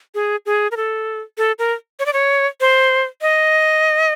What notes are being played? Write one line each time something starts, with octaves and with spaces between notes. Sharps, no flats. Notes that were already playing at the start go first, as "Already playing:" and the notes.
G#4
G#4
A#4
A4
A4
A#4
C#5
D5
C#5
C5
D#5